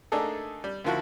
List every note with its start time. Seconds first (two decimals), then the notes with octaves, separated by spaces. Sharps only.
0.12 A3 A#3 D4 D#4 G#4 A4
0.64 G3
0.84 D2 D#3 F3 E4 F#4